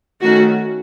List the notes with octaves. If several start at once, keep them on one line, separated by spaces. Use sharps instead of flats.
D#3 A3 C#4 F#4